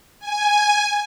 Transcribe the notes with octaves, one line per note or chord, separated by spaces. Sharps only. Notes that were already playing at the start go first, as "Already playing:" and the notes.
G#5